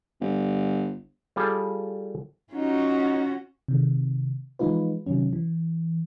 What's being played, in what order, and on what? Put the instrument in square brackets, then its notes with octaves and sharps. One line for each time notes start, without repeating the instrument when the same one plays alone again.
[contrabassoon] G1
[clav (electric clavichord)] G3 F4 G#4 A4
[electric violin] C#4 [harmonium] D#4 [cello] F4 F#4
[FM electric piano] C3 D#3
E3 F3 G#3 D#4 F4 B4
C3 D#3 F#3 C#4
E3